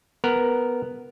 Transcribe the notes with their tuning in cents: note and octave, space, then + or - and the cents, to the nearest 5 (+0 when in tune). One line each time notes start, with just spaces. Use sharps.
B3 +0 A#4 +0